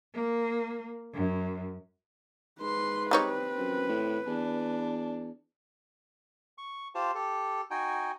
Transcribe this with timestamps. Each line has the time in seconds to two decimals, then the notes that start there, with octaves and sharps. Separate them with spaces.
0.14 A#3
1.13 F#2
2.61 G#2 B4 C6
3.11 G3 C4 D#4 C#5
3.58 F#2
3.89 A2
4.28 E2 D4
6.58 C#6
6.95 F4 G4 C5 A5
7.15 G4 A4
7.71 D#4 F#4 G5 G#5